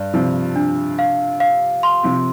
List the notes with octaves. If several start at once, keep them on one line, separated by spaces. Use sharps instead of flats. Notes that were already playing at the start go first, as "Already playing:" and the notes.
Already playing: G2 D5
C3 F3 F4
D4
F5
F5
C6
C3 F3